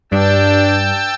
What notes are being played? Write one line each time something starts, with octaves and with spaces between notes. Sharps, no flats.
G2 D4 G5 A5 E6